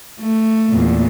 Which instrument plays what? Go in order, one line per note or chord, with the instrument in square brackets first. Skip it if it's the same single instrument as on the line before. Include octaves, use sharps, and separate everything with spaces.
[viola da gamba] A3
[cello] E2 A#2